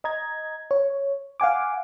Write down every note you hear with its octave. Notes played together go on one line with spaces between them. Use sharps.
D#5 A#5 G#6
C#5
F5 F#5 G#5 D6